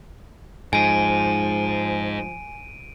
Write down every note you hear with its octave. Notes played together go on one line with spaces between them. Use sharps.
G#2 F3 G#5 D7 D#7